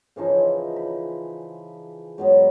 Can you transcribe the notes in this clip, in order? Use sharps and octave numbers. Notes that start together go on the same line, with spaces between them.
C#3 E3 F3 D#4
B5
G#2 F#3 B3